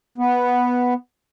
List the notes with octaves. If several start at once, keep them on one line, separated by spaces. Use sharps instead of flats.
B3